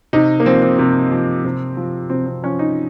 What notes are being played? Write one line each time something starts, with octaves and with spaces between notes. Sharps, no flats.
C3 D#4
A#3
F3 C4
C4
C3
F3
C3
F3
C3 C4
C4
F3 C#4
D#4